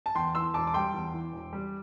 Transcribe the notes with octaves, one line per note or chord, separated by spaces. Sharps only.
A5
E2 G5 C6
E3 C6 E6
E1 A5 D6
D6
G3 G5 C6
E2
E3
E1
G3